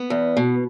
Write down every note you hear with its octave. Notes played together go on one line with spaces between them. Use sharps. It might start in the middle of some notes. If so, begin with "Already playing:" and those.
Already playing: B3
E2
B2